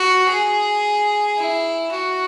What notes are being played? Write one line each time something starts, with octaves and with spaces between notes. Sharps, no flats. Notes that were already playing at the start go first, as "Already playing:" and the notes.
Already playing: F#4
G#4
E4
F#4